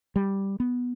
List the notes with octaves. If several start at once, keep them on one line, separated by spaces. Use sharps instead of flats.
G3
B3